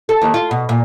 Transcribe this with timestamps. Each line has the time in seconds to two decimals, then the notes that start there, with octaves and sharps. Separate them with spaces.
0.09 A4
0.22 D#2
0.34 F4
0.51 B2
0.69 A#2